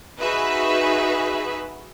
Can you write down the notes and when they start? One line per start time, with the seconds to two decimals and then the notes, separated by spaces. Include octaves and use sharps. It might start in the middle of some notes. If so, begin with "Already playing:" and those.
0.20 D#4 F#4 G#4 B4 E5